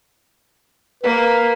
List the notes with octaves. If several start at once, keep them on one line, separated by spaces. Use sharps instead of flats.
A#3 B4